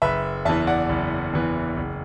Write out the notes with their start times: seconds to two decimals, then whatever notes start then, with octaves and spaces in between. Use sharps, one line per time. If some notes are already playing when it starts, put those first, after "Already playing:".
0.02 F#1 B4 E5
0.45 E2 E3 E5 A5
0.67 D5 F#5
0.89 F#1
1.33 E2 E3
1.77 F#1